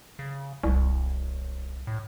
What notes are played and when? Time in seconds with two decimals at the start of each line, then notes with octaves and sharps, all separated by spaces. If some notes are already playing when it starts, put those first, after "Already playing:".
0.19 C#3
0.64 D1 C2
1.87 A2